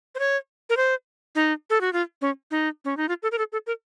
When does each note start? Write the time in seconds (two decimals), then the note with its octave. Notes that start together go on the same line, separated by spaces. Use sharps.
0.15 C5
0.19 C#5
0.70 A#4
0.77 C5
1.35 D#4
1.70 A4
1.81 F#4
1.93 F4
2.21 C#4
2.51 D#4
2.85 C#4
2.97 D#4
3.09 F4
3.23 A4
3.32 A#4
3.38 A4
3.52 A4
3.67 A#4